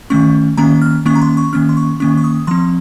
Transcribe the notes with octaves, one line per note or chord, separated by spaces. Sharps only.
D#3 A3 C#4 C#6
D#3 A#3 C#4 A#5
F6
D#3 A#3 C#4 C#6
A#5
C6
C#6
D#3 A#3 C#4 F6
C6
C#6
D#3 A#3 C#4 C#6
C#6
D#6
F3 C4 C6